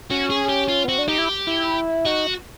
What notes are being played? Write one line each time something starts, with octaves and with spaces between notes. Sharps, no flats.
C#4 F#4
G#4
G4
F4
B3
C4 F#4
D4
D#4 G4
E4
E4
D#4 F#4